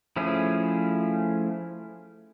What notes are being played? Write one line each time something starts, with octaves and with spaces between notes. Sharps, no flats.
F3 A3 C#4 E4 G#4